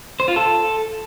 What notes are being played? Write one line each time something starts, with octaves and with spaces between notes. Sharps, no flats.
C5
F4
A4